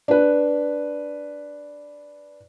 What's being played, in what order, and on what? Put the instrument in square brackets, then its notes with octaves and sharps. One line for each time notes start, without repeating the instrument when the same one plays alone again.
[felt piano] D4 B4